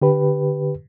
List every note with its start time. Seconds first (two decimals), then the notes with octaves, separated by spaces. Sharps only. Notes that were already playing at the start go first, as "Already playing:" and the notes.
0.02 D3 G4 B4